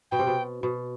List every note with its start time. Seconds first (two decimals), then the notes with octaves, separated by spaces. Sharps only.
0.11 B2 G5
0.19 C3
0.27 B2
0.63 B2